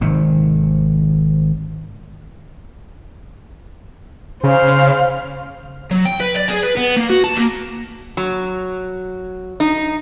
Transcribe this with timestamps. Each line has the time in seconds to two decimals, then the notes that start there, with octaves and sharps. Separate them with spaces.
0.01 G#1 C3 D#3
4.44 C#3 C5 F5
5.91 F#3
6.05 G5
6.20 B4
6.36 D5
6.48 G#4
6.63 B4
6.77 B3
6.97 A#3
7.10 F#4
7.24 A5
7.36 A#3
8.17 F#3
9.60 D#4